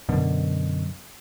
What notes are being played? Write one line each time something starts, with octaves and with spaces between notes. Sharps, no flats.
F#2 B2 D3